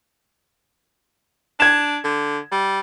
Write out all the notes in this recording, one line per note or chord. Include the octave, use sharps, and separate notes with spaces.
D4 G#6 E7
D3
G3